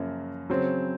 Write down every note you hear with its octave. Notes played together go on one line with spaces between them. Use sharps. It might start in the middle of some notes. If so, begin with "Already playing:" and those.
Already playing: F#2 C#3 F3 A#3
C#3 F#3 C4